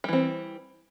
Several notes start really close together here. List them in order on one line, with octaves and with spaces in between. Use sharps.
G3 E3 C4